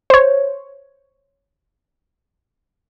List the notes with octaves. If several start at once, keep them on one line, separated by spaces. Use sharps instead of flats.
C5 C#5